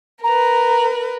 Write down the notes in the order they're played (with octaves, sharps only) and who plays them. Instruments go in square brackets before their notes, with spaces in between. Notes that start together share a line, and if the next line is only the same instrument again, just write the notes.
[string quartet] A#4 B4 [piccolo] A#5